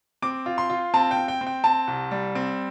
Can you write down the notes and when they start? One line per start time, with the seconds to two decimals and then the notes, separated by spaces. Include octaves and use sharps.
0.22 C4 D6
0.46 F4
0.58 C6
0.70 F4
0.94 C4 A5
1.11 G5
1.17 C4
1.28 G5
1.41 C4
1.47 G5
1.64 C4 A5
1.87 C2
2.11 G3
2.35 C4